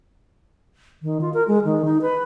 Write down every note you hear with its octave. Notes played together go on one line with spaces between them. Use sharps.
D#3
F4
A#4
G#3
D#3
D#4
B4